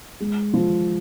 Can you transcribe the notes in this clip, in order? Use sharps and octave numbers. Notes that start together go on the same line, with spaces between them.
G#3
F3